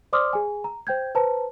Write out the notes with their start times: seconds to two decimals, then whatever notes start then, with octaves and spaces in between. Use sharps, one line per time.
0.13 C5 D5 C6 D6 D#6 F6
0.33 G#4 G#5
0.64 A#5
0.87 C5 G5 G6 G#6
1.15 B4 C5 A5 A#5